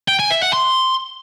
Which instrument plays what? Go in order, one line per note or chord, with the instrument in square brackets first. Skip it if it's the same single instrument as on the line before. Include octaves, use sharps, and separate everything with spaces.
[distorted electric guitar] G5
G#5
E5
F#5
C6